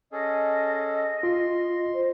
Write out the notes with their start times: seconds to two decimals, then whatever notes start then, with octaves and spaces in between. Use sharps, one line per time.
0.12 C#4 G#4 A4 D#5
1.23 F4 C6
1.94 C5